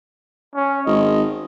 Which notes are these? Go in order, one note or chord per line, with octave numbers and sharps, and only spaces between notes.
C#4
G#1 D#5